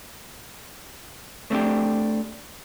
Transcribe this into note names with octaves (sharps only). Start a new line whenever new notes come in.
A3 C4 D4 G4